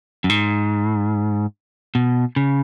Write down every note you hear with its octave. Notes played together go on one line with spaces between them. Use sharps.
F#2
G#2
B2
C#3